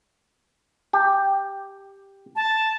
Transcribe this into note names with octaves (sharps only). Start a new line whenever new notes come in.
G4
A5